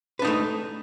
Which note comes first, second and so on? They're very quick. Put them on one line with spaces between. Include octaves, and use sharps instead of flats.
B4 D4 D#4 A3